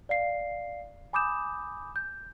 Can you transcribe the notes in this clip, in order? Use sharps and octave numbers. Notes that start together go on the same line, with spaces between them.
D5 F5 C7
G#5 B5 D6 D#6 G6 E7
G6